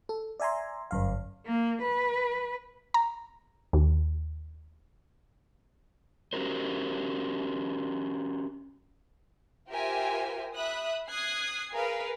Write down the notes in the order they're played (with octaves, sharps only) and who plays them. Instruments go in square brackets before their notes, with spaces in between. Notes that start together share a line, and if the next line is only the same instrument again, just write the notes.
[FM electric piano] A4
D5 E5 G#5 A#5 C6
G1 F#2 F5
[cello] A#3
B4
[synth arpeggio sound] A#5
D#2
[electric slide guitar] C#4 F#4 G4 A#4 C5
[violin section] F4 G4 A#4 C5 E5 G#5
E5 B5 D#6 F#6
D#6 F#6 G#6 C7
G#4 A#4 B4 F5